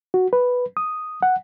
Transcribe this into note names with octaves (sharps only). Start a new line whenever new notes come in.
F#4
B4
D#6
F#5